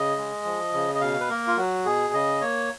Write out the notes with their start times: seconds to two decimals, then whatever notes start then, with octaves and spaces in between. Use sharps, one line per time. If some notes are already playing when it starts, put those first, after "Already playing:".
Already playing: C#3 D#5
0.17 G#3
0.45 F3
0.73 C#3
0.95 D#5
1.01 B2 F5
1.20 B4
1.29 A#3 A#4
1.47 F4
1.57 F#3 F#4
1.85 B2 G#4
2.13 C#3 D#5
2.41 A#3 C#5